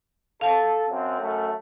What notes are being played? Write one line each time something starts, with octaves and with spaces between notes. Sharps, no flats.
A4 F5 A5
F#2 C4
F#2 A3